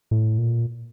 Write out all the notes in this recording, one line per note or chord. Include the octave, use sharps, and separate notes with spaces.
A2
A#2